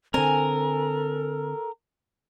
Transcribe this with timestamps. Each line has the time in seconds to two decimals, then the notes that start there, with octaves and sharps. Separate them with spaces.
0.14 D3 C4 A4 A#4 G#5